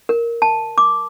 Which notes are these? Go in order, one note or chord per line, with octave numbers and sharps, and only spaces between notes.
A#4
A5
D6